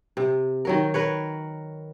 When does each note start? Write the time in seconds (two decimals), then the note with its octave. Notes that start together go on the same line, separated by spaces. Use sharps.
0.17 C3
0.65 D#3 F#3 A#4
0.94 A#4 B4 C#5